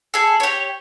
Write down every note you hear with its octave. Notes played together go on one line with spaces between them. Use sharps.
G#4 A4
G4 C#5